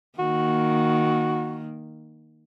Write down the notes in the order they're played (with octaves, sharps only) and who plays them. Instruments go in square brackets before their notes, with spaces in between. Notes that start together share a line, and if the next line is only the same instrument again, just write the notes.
[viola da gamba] D#3 A#3 [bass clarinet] F#4